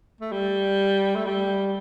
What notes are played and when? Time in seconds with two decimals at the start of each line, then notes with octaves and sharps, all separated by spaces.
0.21 A3
0.32 G3
1.16 A3
1.26 G3